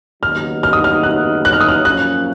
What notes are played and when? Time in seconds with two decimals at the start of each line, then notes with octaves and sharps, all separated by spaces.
0.23 D#2 C#3 F#3 B3 D#4 F6
0.63 F6
0.73 D#6
0.84 F6
1.03 F#6
1.45 F#6
1.53 F6
1.61 D#6
1.69 F6
1.85 F#2 F3 A#3 C#4 F#6